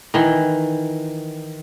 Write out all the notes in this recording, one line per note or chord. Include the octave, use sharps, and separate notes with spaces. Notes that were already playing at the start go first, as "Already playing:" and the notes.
D#3 E3